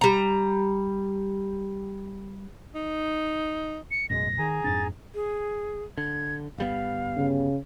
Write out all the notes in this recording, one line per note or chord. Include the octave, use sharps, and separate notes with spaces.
G3 A#5
D#4
C#7
A1 F#2 B2 G#3 A#6
D#3 G#4 G#5 A#5
F2 G#2 D4 A6
G#4
D3 G#6
G1 G3 B3 F5
C#3